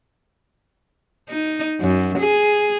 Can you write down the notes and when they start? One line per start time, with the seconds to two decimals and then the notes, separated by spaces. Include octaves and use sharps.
1.29 D#4
1.81 F#2
2.19 G#4